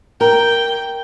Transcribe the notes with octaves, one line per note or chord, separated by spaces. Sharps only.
A#4 G5